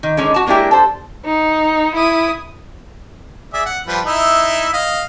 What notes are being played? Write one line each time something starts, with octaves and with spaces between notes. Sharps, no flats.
D#3
D3 D#3 G#3 C#4
F#4 A5
G#3 A#3 D4 E4 G4
A4 C5
D#4
E4 D#6
G#4 D5 E5
F#5
F3 G3 B4
D#4 E4 E5
D#5 F5